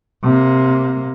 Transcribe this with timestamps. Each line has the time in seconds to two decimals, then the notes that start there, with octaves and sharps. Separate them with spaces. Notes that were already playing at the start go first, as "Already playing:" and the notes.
0.24 C3 A#3